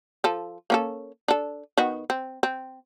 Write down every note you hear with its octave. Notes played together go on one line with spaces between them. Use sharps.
F3 A4
A#3 C#4 A4
D4 A4
D#3 B3 F#4
C4
C4